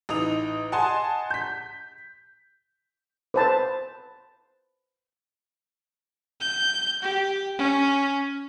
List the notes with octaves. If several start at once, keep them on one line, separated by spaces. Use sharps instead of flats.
A1 D#4 D#6 F7
D#5 F#5 G#5 A5 C6
G6 B6
B4 C5 A5
G6
G4
C#4